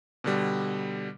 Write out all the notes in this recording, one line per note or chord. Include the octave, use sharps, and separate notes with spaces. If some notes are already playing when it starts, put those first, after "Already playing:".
B2 D3 G3